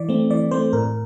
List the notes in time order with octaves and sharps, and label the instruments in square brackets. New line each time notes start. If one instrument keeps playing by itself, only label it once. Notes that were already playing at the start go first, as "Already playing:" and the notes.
Already playing: [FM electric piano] E3 D5
A3 C4
E3 D5
A3 C4 C5
A2 A#4